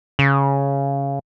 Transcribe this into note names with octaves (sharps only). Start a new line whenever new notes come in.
C#3